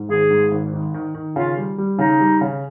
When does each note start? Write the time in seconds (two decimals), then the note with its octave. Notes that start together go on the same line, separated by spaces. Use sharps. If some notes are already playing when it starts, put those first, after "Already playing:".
Already playing: G#2
0.09 G#1 G#4
0.31 G#2
0.51 G#1
0.73 D#3
0.94 D#3
1.15 D#3
1.36 C#3 F4
1.57 G3
1.78 G3
1.99 C#3 D#4
2.21 G3
2.41 C#3